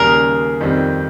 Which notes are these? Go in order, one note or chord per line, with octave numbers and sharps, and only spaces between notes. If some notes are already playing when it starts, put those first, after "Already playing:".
Already playing: D#2 C#3 G3 C#4 G#4 A#4
F2 D#3 G3 C4